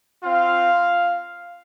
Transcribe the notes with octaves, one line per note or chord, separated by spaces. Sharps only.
C4 F4 F5